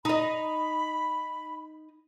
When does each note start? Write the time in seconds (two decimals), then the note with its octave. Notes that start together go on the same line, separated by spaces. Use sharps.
0.05 D#4 D#5 B5